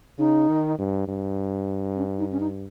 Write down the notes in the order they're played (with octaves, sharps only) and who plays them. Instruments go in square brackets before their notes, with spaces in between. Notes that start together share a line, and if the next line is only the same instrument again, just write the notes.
[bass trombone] C#3 [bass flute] D#4
[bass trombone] D#3
G2
G2
[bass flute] C#4
D#4
C#4
D#4